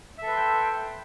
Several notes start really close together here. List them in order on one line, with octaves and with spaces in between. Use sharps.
E5 A4 B4 C6 G5